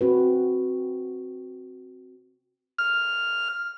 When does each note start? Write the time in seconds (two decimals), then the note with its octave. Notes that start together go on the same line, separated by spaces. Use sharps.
0.01 C4 F#4 B4
2.79 F6